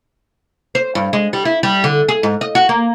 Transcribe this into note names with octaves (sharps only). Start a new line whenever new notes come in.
C5
G2
G#3
G3
E4
G3
D3
G#4
G#2
D#5
F#4
A#3